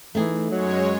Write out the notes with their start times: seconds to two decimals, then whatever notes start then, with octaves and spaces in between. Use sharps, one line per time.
0.15 E3 A3 D#4 G#4
0.51 F#2 F#3 G#3 C#5